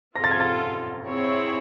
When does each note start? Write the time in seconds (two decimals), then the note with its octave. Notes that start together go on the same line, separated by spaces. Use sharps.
0.16 C4 F4 A4 A#6
0.24 A6
0.31 G#6
0.40 A6
1.06 C4 E4 G#4 C#5